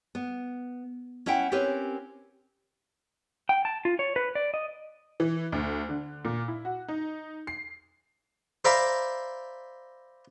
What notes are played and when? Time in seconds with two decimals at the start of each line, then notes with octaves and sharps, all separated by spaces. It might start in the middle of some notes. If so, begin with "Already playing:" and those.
0.15 B3
1.26 C#4 E4 E5 F#5 G5
1.52 C4 C#4 G4 A#4 B4 C#5
3.49 G5
3.65 A5
3.85 F4
3.99 C#5
4.16 B4
4.35 D5
4.54 D#5
5.20 E3
5.52 D2
5.89 D3
6.25 A#2
6.48 E4
6.65 F#4
6.88 D#4
7.47 C7
8.65 C5 D5 E5 F5 A#5 B5